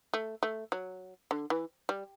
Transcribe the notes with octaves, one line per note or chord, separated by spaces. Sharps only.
A3
A3
F#3
D3
E3
G3